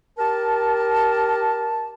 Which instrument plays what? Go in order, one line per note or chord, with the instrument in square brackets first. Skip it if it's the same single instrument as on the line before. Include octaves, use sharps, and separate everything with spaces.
[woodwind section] G4 A#4 A5